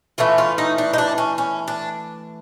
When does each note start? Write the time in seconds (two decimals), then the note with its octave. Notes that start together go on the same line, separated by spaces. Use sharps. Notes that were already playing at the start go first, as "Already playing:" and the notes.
0.18 E3 A3 C#4 F4
0.38 F4
0.58 D#4
0.78 D4
0.93 D#4
0.98 D4
1.18 C#4
1.38 C#4
1.68 D4